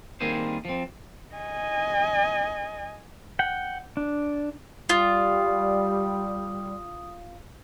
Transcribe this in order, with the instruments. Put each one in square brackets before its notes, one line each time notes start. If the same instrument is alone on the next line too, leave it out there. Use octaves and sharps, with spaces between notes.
[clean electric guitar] D#3 G3 A#3 C4 G#4 C5
F3 C4
[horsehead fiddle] D#5 G#5
[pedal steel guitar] F#5 G5
D4
[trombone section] G3 [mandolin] F4 [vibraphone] D#6